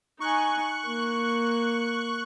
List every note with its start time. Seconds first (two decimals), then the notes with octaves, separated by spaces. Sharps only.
0.20 D#4 G#5 C#6 F#6
0.86 A#3